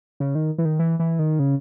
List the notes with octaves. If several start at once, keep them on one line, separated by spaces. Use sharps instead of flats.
C#3
D#3
E3
D#3
E3
E3
D#3
C#3